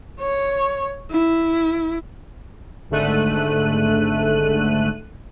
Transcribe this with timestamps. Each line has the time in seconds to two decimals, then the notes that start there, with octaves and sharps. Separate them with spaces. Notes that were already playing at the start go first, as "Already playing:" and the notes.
0.20 C#5
1.11 E4
2.90 G#1 G#2 D3 A3 F#6 D#7